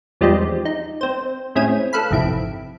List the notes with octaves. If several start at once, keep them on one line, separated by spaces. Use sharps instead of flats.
E2 F3 G3 G#3 C4 D#4
D#4
C4 C5
A2 G#3 C4 C#4 E4 D#7
A4 B4 F5 B5
G#1 F2 C3 E4 D7